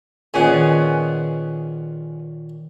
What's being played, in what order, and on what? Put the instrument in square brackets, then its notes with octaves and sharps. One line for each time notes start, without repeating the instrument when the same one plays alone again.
[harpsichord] A#2 D#3 [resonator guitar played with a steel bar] B3 C#4 G#4